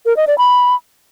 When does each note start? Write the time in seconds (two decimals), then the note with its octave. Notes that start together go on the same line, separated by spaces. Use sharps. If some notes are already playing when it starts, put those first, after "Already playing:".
0.06 A#4
0.16 D#5
0.27 D5
0.38 B5